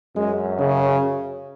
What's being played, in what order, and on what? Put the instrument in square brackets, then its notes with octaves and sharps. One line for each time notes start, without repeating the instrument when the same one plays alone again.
[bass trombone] F#2 [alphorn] G#3
[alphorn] C#3